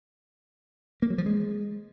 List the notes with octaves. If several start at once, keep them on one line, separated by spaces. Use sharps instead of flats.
A#3
F#3
F3
G#3